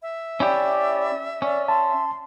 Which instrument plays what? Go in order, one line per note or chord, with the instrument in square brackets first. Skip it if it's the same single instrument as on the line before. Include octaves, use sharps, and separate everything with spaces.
[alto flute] E5
[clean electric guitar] C#4 E4 G4 [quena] D5
[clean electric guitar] C#4 [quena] D5
[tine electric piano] A5 [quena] C6